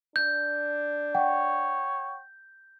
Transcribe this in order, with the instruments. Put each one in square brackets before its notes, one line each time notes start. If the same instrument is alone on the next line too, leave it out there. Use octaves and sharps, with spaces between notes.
[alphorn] D4 [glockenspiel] G6
[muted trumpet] C#5 [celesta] F#5 G5